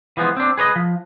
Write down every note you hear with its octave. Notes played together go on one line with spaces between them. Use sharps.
E3 F3 G#3 B3
C4 D4
G#4 B4 C#5 D#5
F3